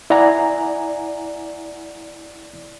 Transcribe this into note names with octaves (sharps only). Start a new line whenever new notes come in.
E4 D5 F#5 G#5 A#5